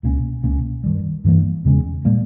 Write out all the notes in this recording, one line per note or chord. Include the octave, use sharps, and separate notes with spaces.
C#2 B2 A#3 C#4
C#2 B2 A#3 C#4
G2 D#3 G3
G2 E3 G3 A#3
E2 C#3 G#3 C#4
A#2 G3 A#3